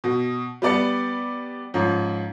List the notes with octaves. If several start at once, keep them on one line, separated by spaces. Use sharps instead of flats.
B2
G3 B3 D5 A6 C#7
G#2 F3 C#4